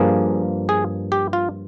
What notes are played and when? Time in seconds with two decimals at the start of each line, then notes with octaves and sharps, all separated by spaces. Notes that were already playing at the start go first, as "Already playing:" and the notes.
Already playing: G2 F3 A#3 G#4
0.69 G#4
1.12 G4
1.33 F4